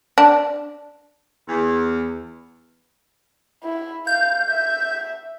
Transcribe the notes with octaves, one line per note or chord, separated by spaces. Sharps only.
D4
E2
E4
F5 G6
E5